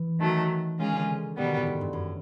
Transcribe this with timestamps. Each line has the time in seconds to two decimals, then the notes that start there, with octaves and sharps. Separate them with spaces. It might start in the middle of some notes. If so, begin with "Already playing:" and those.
Already playing: E3
0.19 D#3 F#3 A3
0.78 D#3 G#3 C#4 F4 G#4
0.92 D3
1.08 C#3
1.37 B2 D#3 G3 B3
1.46 D3
1.57 A2
1.67 G#2
1.81 G2
1.93 F#2